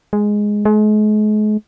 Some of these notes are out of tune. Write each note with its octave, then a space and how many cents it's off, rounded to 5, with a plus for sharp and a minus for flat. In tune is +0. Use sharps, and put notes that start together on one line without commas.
G#3 +0
G#3 +40